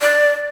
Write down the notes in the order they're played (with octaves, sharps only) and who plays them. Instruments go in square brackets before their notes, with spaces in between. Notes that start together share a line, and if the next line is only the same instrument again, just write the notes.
[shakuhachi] D5